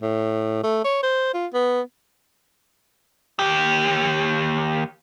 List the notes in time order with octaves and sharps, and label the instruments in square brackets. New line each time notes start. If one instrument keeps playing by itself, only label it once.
[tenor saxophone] A2
A3
C#5
C5
F4
B3
[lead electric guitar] D#2 G4